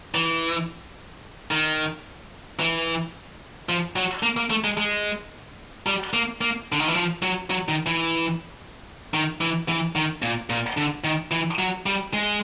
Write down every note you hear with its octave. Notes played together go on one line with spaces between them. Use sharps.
E3
D#3
E3
F3
F#3
A#3
A#3
A3
G#3
G#3
G3
A#3
A#3
D3
D#3
E3
F3
F#3
F#3
D#3
E3
D#3
E3
E3
D#3
A#2
A#2
D3
D#3
E3
F#3
G3
G#3